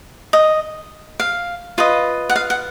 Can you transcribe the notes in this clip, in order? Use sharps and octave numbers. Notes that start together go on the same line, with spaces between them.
D#5
F5
F4 B4 D#5
F#5
F5
F#5